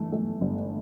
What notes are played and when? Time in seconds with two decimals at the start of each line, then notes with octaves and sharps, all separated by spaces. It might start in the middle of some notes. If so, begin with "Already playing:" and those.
Already playing: G1 E3 A3
0.12 A3
0.41 G1